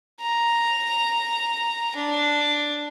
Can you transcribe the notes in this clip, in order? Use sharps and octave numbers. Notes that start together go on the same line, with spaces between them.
A#5
D4